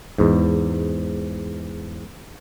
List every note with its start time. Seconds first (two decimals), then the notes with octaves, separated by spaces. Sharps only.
0.18 E2 G#2